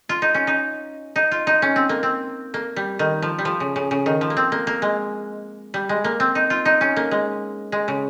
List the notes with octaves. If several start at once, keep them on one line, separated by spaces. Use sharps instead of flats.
F4
D#4
C#4
D#4
D#4
F4
D#4
C#4
C4
A#3
C4
A#3
G3
D#3
F3
G3
F3
C#3
C#3
C#3
D#3
F3
A#3
C4
A#3
A#3
G#3
G3
G#3
A#3
C4
D#4
F4
D#4
C#4
A#3
G#3
G#3
C#3